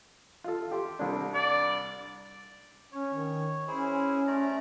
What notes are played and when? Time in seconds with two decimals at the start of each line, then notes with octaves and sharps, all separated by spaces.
0.44 F4 A4
0.71 G4 C6
0.99 C2 D4
1.34 D5
2.92 C#4 C#5
3.14 D#3
3.68 C#4 E4 G#4 C5
4.27 A3 D5 A#5